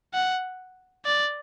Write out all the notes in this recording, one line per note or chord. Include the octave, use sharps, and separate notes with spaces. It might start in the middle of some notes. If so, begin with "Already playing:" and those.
F#5
D5